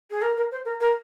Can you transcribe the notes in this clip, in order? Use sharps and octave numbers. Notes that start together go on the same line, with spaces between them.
G#4
A#4
A#4
C5
A#4
A#4